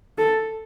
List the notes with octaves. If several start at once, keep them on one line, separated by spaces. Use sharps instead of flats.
A4